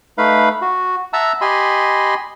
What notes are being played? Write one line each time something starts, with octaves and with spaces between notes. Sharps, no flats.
A3 D#4 B4 F5 B5
F#4
E5 F#5 A5 A#5 E6
G4 D#5 G#5 B5 C6